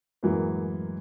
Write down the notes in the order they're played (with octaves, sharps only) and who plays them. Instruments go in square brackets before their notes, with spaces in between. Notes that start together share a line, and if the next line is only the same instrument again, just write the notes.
[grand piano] F#2 A2 E3 F#3 G#3 A#3